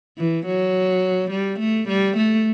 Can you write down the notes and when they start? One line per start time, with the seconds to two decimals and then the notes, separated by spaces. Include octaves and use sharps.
0.18 E3
0.46 F#3
1.31 G3
1.59 A3
1.89 G3
2.17 A3